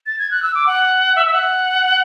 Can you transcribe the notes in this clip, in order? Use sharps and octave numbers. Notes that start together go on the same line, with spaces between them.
A6
G#6
F#6
E6
D6
F#5
E5
E5
F#5